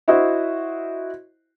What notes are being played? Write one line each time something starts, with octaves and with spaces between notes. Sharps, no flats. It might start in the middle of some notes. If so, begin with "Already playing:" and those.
E4 F#4 C5 D#5 E5